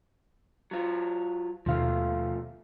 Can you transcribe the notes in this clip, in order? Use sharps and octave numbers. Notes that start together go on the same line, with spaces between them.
F#3 F4
D#2 B2 F3 A3 F5